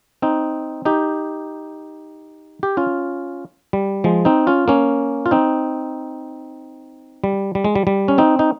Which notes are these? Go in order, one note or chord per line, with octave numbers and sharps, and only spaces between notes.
C4 D#4
D#4 G4
G4
C#4 F4
G3
F3 G#3
C4 D#4
C#4 F4
A#3 C#4
F4
C4 D#4
G3
G3
G#3
G3
G3
C#4
C4 D#4
D#4